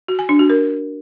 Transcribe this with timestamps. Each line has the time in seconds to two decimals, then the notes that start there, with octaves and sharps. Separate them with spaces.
0.08 F#4
0.19 G#5
0.29 D4
0.39 F#4
0.50 A#4